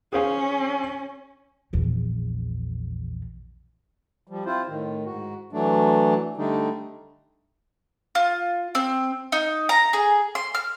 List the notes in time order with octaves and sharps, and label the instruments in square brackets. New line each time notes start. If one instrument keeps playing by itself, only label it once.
[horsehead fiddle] C#4 [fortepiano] G#4 C5 F5
[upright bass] A#1 E2
[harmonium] F3 G3
C4 E4 F4 C5
A2 D#3
G#2 F#4
E3 F#3 A3 D4
D3 G3 A3 D4 D#4
[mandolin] F4
C4
D#4
A#5
G#4
C6
F6